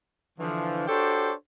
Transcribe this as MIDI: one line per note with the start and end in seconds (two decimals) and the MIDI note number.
0.39 0.86 50
0.39 0.86 52
0.39 0.86 53
0.87 1.32 62
0.87 1.32 66
0.87 1.32 67
0.87 1.32 69
0.87 1.32 72
0.87 1.32 73